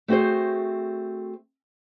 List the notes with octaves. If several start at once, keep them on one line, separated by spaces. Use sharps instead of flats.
A3 C4 F#4 G#4 C5